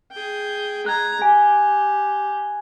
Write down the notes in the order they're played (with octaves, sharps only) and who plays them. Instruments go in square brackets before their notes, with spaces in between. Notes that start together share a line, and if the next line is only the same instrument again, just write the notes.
[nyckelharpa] G#4 G5
[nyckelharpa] G#3 A#5 [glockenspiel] F#6 G#6
[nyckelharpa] G4 [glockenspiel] G#5